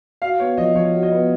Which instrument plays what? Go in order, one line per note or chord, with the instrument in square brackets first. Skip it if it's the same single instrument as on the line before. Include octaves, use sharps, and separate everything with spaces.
[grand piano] F#4 [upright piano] F5
[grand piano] B3 [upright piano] C#5
[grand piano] F3 [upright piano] D#5
[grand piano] F3 [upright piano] C#5
[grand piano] F#4
[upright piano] D#5
[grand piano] B3